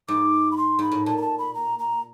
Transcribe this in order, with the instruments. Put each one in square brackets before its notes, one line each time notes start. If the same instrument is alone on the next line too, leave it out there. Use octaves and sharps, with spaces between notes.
[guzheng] G#2 [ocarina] D6
[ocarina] B5
C6
[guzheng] G#2 [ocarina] B5
[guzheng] A2
[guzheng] A#2 [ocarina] A5
[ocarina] A#5
A5
B5
A#5
A#5